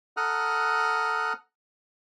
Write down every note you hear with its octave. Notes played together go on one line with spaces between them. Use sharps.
A4 F#5 A#5 D#6 F6 F#6